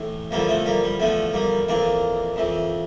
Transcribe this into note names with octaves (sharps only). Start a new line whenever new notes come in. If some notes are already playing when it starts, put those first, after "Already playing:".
Already playing: A2 E3
E2 D3 F3 G3 A#3
A3 C4
G3 A#3
G3
E2 D3 F3 A3
G3 A#3
F2 E3 A#3 D4
F2 E3